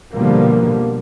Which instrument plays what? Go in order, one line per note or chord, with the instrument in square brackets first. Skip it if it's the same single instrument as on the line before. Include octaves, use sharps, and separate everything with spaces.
[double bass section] B2 D3 F3 G3 A#3